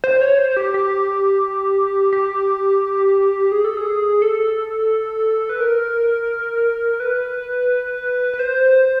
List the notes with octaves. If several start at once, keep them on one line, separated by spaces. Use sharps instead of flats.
C5
C#5
C5
G4
G4
G4
G#4
A4
G#4
A4
B4
A#4
B4
B4
C5